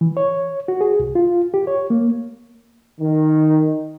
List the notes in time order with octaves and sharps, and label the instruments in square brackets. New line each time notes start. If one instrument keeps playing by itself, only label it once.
[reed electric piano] E3
C#5
F#4
G#4
C2
F4
G4
C#5
A#3
[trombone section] D#3